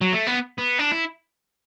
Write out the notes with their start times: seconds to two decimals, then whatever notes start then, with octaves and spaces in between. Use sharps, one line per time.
0.01 F#3
0.13 A3
0.27 B3
0.59 B3
0.79 D4
0.92 E4